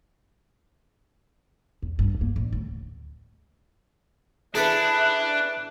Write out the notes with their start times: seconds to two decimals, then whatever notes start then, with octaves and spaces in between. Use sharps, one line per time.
1.82 E2
1.99 G2
2.21 A#3
2.36 A1
2.53 D2
4.55 D4 E4 G#4 A4 B4 F#6